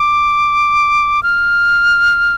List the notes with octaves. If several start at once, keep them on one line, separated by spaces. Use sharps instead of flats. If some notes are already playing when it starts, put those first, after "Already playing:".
Already playing: D6
F6